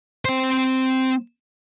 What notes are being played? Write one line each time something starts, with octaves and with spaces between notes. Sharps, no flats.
C4 C5